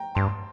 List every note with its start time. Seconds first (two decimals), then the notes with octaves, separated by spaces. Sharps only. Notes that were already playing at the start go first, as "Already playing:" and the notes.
Already playing: G5 A#5
0.15 G2 A5 C6